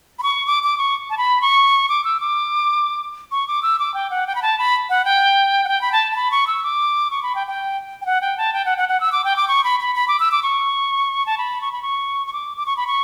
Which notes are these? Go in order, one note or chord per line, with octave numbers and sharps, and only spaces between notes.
B5
C#6
D6
D6
C#6
A5
B5
C#6
D6
E6
D6
C#6
D6
E6
D6
G5
F#5
G5
B5
A5
B5
F#5
G5
F#5
G5
B5
A5
A5
B5
C#6
E6
D6
C#6
B5
G5
G5
G5
F#5
G5
A5
G5
F#5
F#5
F#5
E6
D6
G5
D6
C#6
B5
B5
B5
D6
E6
D6
C#6
A5
B5
C#6
B5
C#6
C#6
D6
D6
C#6
B5
C#6